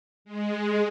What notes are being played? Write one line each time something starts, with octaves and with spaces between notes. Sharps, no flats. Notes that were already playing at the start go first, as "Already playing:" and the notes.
G#3